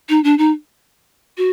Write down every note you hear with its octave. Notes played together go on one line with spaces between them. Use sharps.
D#4
D4
D#4
F#4